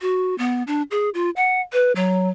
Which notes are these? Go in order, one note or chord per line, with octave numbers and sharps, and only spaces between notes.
F#4
B3
D4
G#4
F4
F#5
B4
F#3